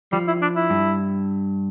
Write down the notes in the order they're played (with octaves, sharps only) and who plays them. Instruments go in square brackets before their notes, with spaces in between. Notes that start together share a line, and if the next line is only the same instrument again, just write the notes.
[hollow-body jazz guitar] F3 [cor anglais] G3
[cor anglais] E4
D4
E4
[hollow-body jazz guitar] G2